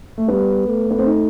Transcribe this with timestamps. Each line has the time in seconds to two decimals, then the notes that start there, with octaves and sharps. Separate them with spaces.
0.18 A3
0.28 G3 B3
0.67 A3
0.91 B3
0.99 C4
1.06 D#4